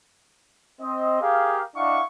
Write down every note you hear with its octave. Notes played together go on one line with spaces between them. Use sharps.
C4 D#5
G4 G#4 A#4 F5
D4 E4 D#5 F5 F#5 C#6